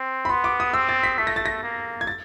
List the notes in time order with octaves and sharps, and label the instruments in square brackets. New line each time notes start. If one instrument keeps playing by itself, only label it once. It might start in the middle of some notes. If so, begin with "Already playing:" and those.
Already playing: [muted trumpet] C4
[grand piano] B5
[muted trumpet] B3 [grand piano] C6
[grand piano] D6
D#6
[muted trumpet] C4 [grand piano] E6
[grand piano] A6
B6
[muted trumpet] A3 [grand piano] B6
[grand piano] A#6
A6
A#6
[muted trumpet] A#3
[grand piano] G#6
A6